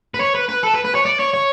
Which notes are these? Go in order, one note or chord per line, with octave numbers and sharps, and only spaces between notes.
B4
C#5
B4
B4
A4
B4
B4
C#5
D5
C#5
C#5